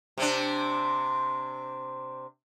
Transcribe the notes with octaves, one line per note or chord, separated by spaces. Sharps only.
C3 C4 D4